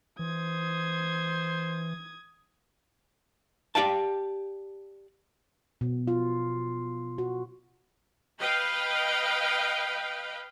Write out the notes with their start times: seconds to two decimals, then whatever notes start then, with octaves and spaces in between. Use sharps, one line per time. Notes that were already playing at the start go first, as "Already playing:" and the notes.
0.19 E3 C5 D#6 G#6
3.75 G4 D5 F5 G5 A5
5.81 B2
6.08 F4
7.18 F#4
8.40 B4 D#5 F5 G5